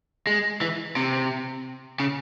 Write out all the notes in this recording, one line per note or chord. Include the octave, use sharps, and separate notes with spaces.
G#3
E3
C3
C#3